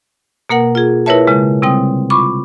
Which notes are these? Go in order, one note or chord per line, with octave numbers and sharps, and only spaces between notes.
B2 A#3 A#4 F#5
F4 G#4
E4 A#4 B4 C#5 E5 A5
C#3 G#3
C3 G3 C4 G5 D#6
F4 B5 C#6 D6